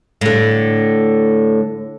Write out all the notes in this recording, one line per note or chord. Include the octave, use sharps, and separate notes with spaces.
A2 D3